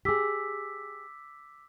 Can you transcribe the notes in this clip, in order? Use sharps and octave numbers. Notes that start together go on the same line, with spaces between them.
G4 G#4 D6 E6 B6